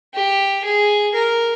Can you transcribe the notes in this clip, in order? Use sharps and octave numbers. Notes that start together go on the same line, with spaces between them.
G4
G#4
A#4